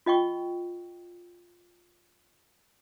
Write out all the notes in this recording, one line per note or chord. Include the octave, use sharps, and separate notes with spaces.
F4 D#5 G5 C#6